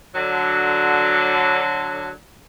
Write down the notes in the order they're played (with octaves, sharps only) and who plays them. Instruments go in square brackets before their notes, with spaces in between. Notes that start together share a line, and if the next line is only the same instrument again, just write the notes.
[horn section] D3 F#3